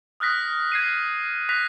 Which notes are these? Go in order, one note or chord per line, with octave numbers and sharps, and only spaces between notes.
D#6 F6 F#6 A#6 B6
G#6 C7 D#7
F#6 A#6 B6 F7